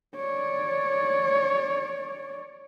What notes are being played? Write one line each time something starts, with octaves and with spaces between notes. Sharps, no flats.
C#5 D5